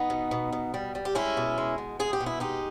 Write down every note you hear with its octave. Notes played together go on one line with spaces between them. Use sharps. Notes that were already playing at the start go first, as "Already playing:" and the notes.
Already playing: B3 D#4
B2
B2
B2
G3
G3
G4
G#3 C#4 E4
B2
G#3
B2
G#3 G#4
G4
B2
E4
G#3 D#4 G4